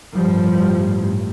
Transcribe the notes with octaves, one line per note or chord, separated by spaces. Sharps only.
A1 G2 F3 G3